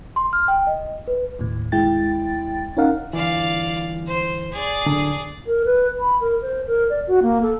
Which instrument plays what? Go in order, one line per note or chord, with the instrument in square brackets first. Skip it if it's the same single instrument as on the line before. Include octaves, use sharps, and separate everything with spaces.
[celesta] C6
F6
G5
D#5
B4
[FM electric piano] D#2 A2
D#2 G#3 E4 G5 A6
C#4 D#4 A#4 F5 F#5
[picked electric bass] G1 E3 [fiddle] D5 F5
[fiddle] C5
G#4 D5
[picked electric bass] D1 D3 D4
[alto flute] A#4
B4
B5
A#4
C5
A#4
D5
F#4
A#3
A4